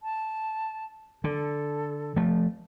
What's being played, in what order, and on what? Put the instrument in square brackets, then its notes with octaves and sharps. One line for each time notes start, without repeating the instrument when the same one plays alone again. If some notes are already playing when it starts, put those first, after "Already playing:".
[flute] A5
[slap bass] D3 [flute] A4
[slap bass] F3 A3